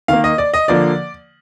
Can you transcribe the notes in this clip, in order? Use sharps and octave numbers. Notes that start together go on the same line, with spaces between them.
D#3 A#3 F5
D#5
D5
D#5
D3 F3 A#3 D5